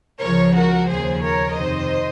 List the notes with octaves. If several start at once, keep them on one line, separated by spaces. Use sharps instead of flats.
C#2 C#3 F3 A#4 C#5
F#4 A#4
D#2 C#3 F3 G#4 C5
A#4 C#5
F2 C3 D#3 C5 D#5